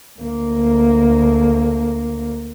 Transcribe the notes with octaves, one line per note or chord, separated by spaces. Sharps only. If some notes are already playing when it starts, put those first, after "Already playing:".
D2 A#3